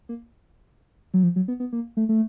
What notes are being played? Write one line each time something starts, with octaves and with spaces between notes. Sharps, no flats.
A#3
F#3
F3
F#3
B3
B3
A#3
A3
A3